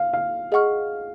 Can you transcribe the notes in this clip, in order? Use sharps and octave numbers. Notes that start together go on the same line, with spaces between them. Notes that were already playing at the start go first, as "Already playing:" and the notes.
Already playing: F5
F5
G#4 D#5 F#5 C#6 F6